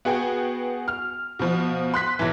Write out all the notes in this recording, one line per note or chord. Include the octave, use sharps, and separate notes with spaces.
B3 F#4 G#4 G5
F6
B2 F3
C6 F#6 B6
B1 E3